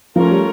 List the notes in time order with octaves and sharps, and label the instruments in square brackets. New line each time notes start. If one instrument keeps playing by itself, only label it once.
[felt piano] F3 [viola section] A3 C#4 F4 A#4
[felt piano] G3